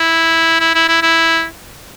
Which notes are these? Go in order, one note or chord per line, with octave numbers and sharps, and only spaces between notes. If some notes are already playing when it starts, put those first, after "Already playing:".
Already playing: E4
E4
E4
E4
E4